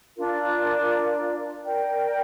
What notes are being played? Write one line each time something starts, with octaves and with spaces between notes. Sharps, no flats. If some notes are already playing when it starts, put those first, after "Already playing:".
D4 F4 A#4
A#4 D5 G5